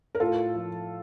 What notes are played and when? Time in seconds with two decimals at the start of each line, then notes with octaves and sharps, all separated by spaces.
0.15 A#4
0.20 A2 F4 A4
0.55 F3